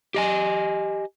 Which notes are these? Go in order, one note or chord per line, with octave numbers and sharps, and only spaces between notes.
G4 D#5 G#5